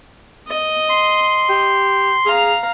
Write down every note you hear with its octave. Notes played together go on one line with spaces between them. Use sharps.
D#5
C6
G4
G#4 F5 A#5